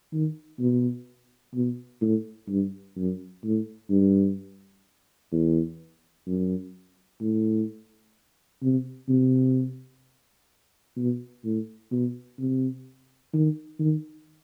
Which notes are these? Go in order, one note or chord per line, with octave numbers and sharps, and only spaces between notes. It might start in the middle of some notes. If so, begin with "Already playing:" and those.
D#3
B2
B2
A2
G2
F#2
A2
G2
E2
F#2
A2
C3
C3
B2
A2
B2
C3
D#3
D#3